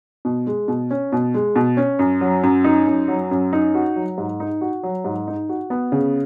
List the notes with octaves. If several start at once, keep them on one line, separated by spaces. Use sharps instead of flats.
B2
G#3
B2
C#4
B2
G#3
B2
C#4
F#2
F#3
F#2
D#4
F#2
F#3
F#2
D#4
F#4
F#3
G#2
D#4
F#4
F#3
G#2
D#4
F#4
B3
C#3